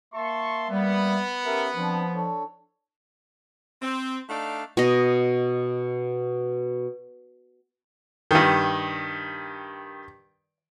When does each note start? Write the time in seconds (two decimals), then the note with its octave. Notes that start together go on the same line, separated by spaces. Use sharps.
0.14 A#3 E5 A5 C6 C#6
0.70 G3 B3
1.46 C#4 G4 A#4 E5
1.76 F3 C4 D4
2.14 D4 A4 C#5
3.82 C4
4.29 A3 D4 D#4 D5 F5
4.77 B2 D#5
8.31 G2 D#3